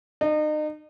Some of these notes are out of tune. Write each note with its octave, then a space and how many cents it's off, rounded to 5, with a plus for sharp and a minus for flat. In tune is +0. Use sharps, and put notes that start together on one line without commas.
D#4 -35